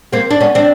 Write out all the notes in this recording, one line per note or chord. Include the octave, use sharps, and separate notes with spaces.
A#3 C4
D4
B3 C#4
C4 D4